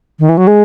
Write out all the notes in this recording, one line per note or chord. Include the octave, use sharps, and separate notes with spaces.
D#3
E3
F#3
G#3